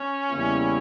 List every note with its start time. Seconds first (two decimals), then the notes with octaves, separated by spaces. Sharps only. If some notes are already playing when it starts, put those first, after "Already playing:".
Already playing: C#4
0.31 E2 C#3 G3 A#3 E4